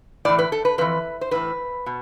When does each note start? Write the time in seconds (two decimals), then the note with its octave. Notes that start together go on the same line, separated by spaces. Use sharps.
0.25 A2 E3 D5
0.39 B4
0.52 A4
0.65 B4
0.78 F2 E3 B4
1.21 C5
1.31 A2 E3 B4
1.86 B2